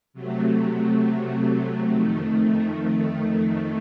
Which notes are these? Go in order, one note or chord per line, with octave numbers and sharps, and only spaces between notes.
C3 F#3 A3
F2 D#3 A3